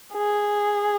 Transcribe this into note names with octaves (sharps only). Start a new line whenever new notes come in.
G#4